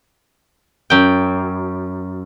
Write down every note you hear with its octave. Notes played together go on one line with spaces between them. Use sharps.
F#2 G5